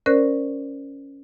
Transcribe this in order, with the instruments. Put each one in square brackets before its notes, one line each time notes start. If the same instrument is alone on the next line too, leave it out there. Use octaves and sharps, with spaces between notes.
[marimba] C#4 A#4 C5 D5 F#6